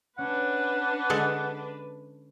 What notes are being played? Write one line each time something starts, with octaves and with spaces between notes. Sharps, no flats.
C#4 D4 B4 F#5
D3 G#3 A4